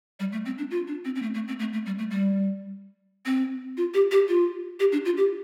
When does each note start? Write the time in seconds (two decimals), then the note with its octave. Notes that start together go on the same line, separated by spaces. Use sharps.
0.20 G3
0.32 A3
0.46 C4
0.58 D4
0.71 F4
0.87 D4
1.05 C4
1.15 C4
1.22 A3
1.34 A3
1.48 C4
1.59 A3
1.73 A3
1.86 G3
1.99 A3
2.11 G3
3.26 C4
3.77 F4
3.94 G4
4.11 G4
4.29 F4
4.80 G4
4.92 D4
5.05 F4
5.17 G4